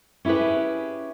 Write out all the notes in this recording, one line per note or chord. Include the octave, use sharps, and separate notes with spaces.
C#4 E4 G4 G#4 B4